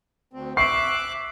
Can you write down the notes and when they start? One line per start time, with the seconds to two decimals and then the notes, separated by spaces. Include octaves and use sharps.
0.33 D2 C4
0.57 E5 C#6 D6 F#6 C7